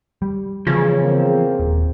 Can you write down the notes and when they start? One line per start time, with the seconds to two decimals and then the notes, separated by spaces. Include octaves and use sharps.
0.22 G3
0.67 E2 C#3 F3
1.02 A#3 C4
1.60 D#1